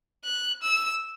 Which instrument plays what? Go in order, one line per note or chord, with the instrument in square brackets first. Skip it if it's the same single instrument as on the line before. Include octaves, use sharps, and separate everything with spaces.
[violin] F#6
E6